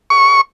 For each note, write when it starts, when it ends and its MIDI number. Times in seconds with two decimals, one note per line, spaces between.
0.10 0.41 85